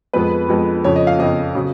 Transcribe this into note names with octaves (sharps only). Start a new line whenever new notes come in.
F2 F3 G#3 B3 B4
F2 F3 G#3 B3
F2 C#3 F3 C#5
D#5
F5
F2 C#3 F3 D#5
C#3 F#3